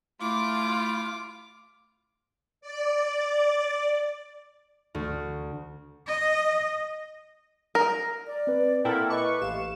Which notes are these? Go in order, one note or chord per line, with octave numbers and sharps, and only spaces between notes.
A3 E4 F4 D6
D5
D2
D#5
A#4
D5
C4 B4
A#2 E4 A4 A#4 F#5 G5 A5
B4 D#5 C#6 D6
A1 G4 F5 E7